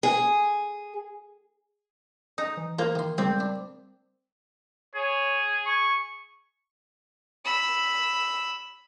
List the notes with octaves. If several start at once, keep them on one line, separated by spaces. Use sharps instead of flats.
G#4
D#4 D#6
E3
A#3 F4 C5
D#3 C6
C#2 A#2 G3 C4 D#6
D4
G#4 C#5
C#6
B5 E6